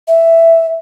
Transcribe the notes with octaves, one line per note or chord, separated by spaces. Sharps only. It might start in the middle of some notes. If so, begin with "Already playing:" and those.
E5